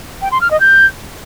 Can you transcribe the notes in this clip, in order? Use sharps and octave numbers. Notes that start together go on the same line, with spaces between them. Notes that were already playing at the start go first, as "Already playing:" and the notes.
G5
C6
F6
D#5
G6